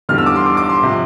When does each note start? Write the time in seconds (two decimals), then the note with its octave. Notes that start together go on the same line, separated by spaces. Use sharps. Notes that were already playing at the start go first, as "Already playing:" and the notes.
0.09 E2 D3 G3 F6
0.18 E6
0.26 D6
0.36 C6
0.46 D6
0.57 D6
0.69 C6
0.82 C3 F3